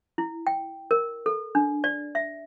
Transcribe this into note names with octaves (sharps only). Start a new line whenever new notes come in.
E4
G5
A#4
A4
D4
D5
E5